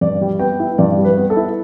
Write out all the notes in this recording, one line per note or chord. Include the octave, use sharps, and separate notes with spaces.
G2 D5
G3
B3 G5
E4
G2 D5
G3
B4
B3
A4
E4